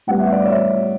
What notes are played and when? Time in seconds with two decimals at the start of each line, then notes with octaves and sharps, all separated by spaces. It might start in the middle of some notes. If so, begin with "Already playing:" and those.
0.07 A2 G3 B3 F#5
0.19 E5
0.32 D5
0.44 C#5 E5